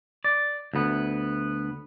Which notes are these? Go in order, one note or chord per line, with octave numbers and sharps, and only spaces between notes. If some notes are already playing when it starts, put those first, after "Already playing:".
D5
D2 B3